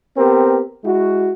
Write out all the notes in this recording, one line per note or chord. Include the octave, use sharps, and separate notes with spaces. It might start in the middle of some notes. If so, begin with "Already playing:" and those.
B3 C4 G4 A#4
G#3 E4 F#4